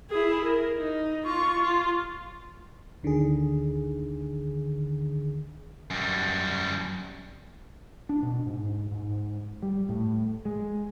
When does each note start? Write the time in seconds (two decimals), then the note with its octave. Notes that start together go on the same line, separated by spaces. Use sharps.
0.10 E4 G#4
0.45 A#4
0.78 D#4
1.25 F4 C#6
1.59 F4
3.03 D2 D3 D#3 G#4
5.91 F#2 G3
8.09 D4
8.22 B2
8.46 G#2
8.91 G#2
9.63 G3
9.89 A2
10.45 G#3